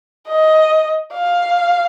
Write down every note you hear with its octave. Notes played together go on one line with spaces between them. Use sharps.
D#5
F5